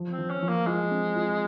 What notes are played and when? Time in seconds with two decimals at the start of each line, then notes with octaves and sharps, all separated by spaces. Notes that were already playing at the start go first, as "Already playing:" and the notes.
Already playing: F3
0.12 C4
0.18 F3
0.30 C#4
0.42 F3
0.49 A#3
0.66 G#3 F4
0.91 C4
1.16 F4